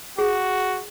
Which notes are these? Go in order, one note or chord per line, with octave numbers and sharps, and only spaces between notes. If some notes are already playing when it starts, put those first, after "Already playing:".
F#4 G#4